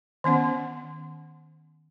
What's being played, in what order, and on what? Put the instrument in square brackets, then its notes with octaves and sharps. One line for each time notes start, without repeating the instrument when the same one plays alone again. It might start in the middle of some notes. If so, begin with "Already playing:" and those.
[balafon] D#3 B3 C#4 F#5